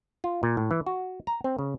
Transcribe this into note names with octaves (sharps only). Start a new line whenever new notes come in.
F4
A#2
A2
E3
F#4
A#5
C4
C#3